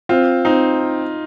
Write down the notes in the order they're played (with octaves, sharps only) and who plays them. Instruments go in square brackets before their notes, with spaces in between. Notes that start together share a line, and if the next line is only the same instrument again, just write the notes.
[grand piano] C4 [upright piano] F4
[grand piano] C4 [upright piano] D#4